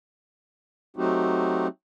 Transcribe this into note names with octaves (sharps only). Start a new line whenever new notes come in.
F#3 A3 C4 D#4 F#4 G4